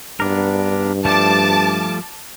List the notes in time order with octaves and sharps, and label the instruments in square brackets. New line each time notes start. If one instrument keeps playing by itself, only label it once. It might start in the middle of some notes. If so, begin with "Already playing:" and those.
[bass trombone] G2 [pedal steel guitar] B3 D4 A#4
[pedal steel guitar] F3 G3 A3 [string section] A5 D6